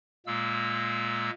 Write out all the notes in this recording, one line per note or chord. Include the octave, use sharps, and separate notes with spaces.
A#2 G#3 A#3 E6